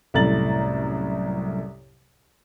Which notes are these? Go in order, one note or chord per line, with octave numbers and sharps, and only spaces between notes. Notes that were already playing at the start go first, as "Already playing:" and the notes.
C2 F#2 A2 A#5 A6 F#7